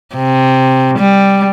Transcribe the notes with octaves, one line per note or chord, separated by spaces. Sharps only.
C3
G3